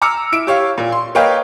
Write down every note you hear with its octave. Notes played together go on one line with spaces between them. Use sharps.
A#5 D6 E6 F6 C#7
E4 D7
G4 C#5 F5
A#2
C6
A#3 B4 C#5 D#5 F5 G5